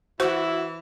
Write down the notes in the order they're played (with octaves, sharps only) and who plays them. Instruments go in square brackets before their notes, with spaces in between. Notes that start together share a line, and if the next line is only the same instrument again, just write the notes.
[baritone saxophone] E3 [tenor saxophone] E4 [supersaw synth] F#4 [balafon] C5